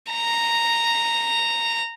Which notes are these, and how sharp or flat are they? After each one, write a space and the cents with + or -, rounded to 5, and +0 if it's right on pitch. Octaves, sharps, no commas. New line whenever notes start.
A#5 -10